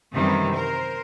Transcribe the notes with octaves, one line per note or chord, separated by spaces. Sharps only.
F#2 C3 D#3 E3 G3 A3
A#4 C5